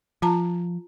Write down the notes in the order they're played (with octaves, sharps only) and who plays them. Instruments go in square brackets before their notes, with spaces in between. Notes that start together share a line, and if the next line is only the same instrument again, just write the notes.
[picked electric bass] F3 [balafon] F4 A5 A#5